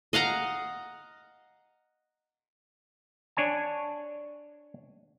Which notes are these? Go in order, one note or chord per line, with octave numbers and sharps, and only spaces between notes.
D#5 F5 F#5 A#5
D4 C#5 G#5 A5